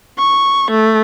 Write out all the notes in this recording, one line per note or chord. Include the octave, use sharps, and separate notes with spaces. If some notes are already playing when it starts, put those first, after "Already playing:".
C#6
A3